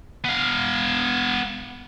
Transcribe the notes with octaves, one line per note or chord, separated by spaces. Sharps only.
B3 F5